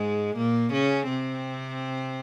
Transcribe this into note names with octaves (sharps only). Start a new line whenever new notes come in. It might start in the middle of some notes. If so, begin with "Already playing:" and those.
Already playing: G#2 G#3
A#2 A#3
C#3 C#4
C3 C4